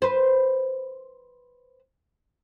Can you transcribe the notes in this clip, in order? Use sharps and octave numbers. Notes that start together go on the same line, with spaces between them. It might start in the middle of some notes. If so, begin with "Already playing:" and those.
B4 C5